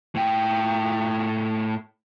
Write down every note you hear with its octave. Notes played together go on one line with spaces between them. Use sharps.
A2 G5